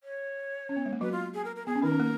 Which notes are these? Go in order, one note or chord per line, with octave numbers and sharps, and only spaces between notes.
C#5
C#4
B3
G#3
A#3
F#3 F#4 B4
F4
G#4
A#4
A#4
B3 G#4
C#4
D#3 D#4 A#4
C#4
A#3